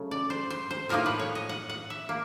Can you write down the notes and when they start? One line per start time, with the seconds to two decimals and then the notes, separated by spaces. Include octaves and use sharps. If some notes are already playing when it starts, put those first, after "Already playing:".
Already playing: C#3 F#3 A3 C#4
0.11 D5
0.30 C5
0.50 C5
0.71 C5
0.89 A2 F3 A#3 D#4 A#4
1.06 B4
1.19 C#5
1.35 D#5
1.49 F#5
1.70 F#5
1.90 E5
2.09 A#3